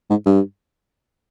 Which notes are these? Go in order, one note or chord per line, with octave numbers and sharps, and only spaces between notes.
G#2
G2